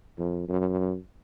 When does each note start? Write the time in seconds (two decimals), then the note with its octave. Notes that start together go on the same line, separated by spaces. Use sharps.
0.18 F2
0.48 F#2